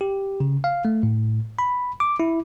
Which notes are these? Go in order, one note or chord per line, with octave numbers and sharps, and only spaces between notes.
G4
C#3
F5
A3
A2
B5
D6
E4